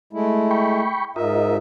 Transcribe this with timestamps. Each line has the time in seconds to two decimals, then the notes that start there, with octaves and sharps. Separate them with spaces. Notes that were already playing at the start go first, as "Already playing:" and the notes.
0.13 G#3 A3 E4
0.51 G5 B5 C#6
1.16 G#2 F4 A#4 D#5 E5